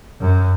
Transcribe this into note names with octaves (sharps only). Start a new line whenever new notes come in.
F#2